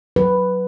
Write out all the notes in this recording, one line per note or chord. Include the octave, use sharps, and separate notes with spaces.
F#3 B4